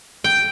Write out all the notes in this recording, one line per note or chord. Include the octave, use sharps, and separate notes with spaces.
G5